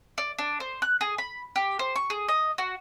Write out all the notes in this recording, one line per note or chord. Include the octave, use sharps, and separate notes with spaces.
D5
D4
C5
F#6
G#4
B5
G4
C5
C#6
G#4
D#5
F#4